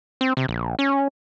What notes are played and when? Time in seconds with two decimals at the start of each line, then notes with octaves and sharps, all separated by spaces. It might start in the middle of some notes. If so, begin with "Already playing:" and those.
0.21 C4
0.37 C3
0.48 A#1
0.79 C#4